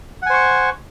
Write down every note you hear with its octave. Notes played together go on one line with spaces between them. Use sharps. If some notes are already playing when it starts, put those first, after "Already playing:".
C5 F#5 G#5 C#6